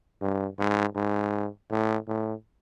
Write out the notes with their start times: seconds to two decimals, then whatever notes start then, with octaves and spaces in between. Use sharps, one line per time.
0.21 G2
0.59 G#2
0.96 G#2
1.71 A2
2.08 A2